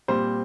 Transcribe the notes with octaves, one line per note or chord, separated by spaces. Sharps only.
A#2 G3 C4 C5